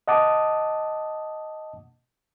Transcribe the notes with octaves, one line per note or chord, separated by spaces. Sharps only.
D#5 F#5 A5 D6 D#6